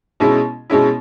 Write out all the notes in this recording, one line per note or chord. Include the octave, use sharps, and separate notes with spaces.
B2 G#3 C#4 E4
B2 G#3 C#4 E4